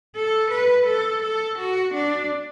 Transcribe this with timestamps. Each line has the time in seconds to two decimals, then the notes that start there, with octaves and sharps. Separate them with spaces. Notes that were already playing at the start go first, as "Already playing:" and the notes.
0.15 A4
0.51 B4
0.87 A4
1.22 A4
1.58 F#4
1.94 D4